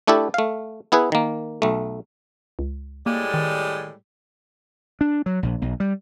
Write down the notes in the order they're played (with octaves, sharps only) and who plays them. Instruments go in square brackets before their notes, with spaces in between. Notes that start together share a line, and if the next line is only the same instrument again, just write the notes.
[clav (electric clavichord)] A3 D4 E4 G4 A4
A3 F5
B3 E4 G#4 B4
D#3 A#3
B1 A3
[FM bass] C#2
[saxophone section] A2 G3 G#3 [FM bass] A#3
[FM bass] D#3
[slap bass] D4
F#3
A#1
B1
G3